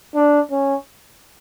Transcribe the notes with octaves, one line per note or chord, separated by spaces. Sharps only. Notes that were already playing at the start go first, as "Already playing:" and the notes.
D4
C#4